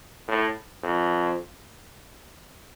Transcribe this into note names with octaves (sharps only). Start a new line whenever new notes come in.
A2
F2